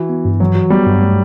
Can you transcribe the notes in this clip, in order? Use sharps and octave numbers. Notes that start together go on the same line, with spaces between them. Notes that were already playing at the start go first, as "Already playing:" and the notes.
Already playing: E3 F#4
B3
G2
E3 F#3
F#4
G3 B3
G2
A3